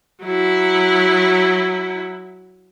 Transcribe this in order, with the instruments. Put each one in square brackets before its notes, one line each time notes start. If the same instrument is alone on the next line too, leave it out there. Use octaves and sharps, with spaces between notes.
[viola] F#3 E4